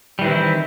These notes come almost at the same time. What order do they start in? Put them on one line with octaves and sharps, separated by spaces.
G3 E3 D#3 C4 E4